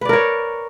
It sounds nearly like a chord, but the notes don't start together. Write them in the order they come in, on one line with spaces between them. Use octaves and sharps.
B4 D5 A#4 C#5